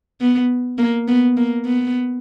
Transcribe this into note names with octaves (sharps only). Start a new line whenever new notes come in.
B3
A#3
B3
A#3
B3